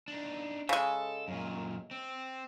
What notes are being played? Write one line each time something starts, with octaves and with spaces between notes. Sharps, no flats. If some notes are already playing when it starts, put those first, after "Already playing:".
D4 D#4
C#3 G#3 A4
F#2 A#2
C4